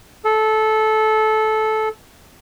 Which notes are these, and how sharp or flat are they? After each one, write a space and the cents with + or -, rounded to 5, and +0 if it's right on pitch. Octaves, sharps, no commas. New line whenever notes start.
A4 -15